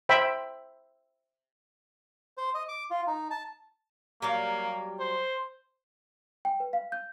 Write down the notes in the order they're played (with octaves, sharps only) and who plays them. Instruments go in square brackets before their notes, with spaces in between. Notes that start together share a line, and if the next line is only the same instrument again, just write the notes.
[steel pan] C5 E5 G5 B5
[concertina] C5
D#5
D6
F4
D#4
A5
[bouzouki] F#3 G3 F5 [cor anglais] A#3
[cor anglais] C5
[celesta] G5
B4
F5
G6